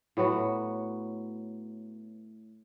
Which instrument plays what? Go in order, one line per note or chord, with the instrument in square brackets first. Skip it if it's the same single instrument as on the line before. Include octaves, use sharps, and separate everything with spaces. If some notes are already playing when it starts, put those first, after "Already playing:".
[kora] A2 F#3 B3 F#4